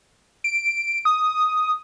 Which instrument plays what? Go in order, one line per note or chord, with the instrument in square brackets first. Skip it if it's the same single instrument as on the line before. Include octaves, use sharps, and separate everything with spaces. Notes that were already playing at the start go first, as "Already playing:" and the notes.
[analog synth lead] D7
D#6